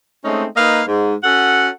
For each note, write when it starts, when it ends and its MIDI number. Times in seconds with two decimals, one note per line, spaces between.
0.25 0.46 56
0.25 0.46 57
0.25 0.46 60
0.25 0.46 61
0.25 0.46 63
0.56 0.82 58
0.56 0.82 63
0.56 0.82 71
0.56 0.82 75
0.56 0.82 77
0.87 1.14 44
1.23 1.69 61
1.23 1.69 66
1.23 1.69 69
1.23 1.69 78